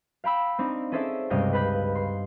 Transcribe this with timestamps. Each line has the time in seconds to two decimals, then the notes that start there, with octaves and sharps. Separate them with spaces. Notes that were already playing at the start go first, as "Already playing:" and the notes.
0.24 F5 G5 B5 E6
0.59 C4 D4 D#4
0.92 C#4 G#4 A4 C5 D5 E5
1.30 C#2 G2 C3 D#5 F5 G5
1.53 B4 F5 B5 G6 B6
1.95 C6